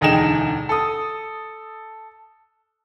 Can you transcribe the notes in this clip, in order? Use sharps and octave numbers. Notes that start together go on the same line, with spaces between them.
E1 D2 D#4 G#4 G5 E7
A4 D#6